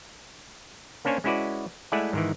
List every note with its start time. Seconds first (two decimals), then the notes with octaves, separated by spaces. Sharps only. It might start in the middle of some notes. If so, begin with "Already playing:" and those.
1.05 A#3 C#4 D4 C5 C#5 G#5
1.24 G#3 C#4 E4 F#4 B4 D5
1.92 G#3 A3 E4 D5 F#5 G#5
2.13 G#2 D#3 E3